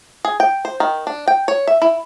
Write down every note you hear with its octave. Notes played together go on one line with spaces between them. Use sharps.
G#4
G5
C5
D#3
D4
G5
C#5
E5
E4